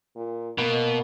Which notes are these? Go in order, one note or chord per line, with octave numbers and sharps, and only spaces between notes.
A#2
B2 A#3